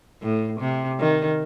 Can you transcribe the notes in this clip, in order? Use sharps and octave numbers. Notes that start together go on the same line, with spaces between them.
A2
C3
D#3